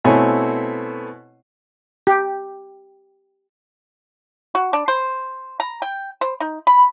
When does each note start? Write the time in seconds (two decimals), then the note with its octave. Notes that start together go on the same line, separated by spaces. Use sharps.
0.04 B2 A3 C4 E4 C#5 G#5
2.07 G4
4.55 F#4
4.73 D4
4.88 C5
5.60 A#5
5.82 G5
6.21 C5
6.40 D#4
6.67 B5